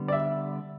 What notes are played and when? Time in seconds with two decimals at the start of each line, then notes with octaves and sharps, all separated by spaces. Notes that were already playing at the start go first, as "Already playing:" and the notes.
Already playing: D3 G3 B3
0.08 D5
0.12 E5